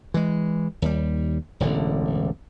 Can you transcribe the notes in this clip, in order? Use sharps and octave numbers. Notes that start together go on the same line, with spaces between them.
E3 G#3
D#2 G3
E1 A1 D3